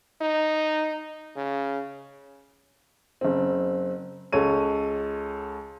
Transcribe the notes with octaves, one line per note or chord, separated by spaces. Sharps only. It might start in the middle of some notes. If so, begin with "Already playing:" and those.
D#4
C#3
F#1 C4
C#2 A4 C#5 D#7